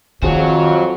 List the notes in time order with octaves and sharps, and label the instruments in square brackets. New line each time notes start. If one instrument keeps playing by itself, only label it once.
[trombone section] F2 [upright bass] D#3 [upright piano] F4 G#4 C5 [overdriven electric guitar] F#4 C#5